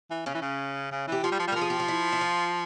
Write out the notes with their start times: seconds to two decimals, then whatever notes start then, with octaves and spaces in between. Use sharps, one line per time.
0.11 E3
0.26 C#3 C#4
0.35 E3
0.42 C#3
0.92 C#3
1.07 E3 G4
1.23 F3 F4
1.32 G3
1.39 F3
1.47 G3
1.52 F3 A#4
1.61 G#4
1.70 G4
1.80 F4
1.88 E4
2.12 E4
2.21 F4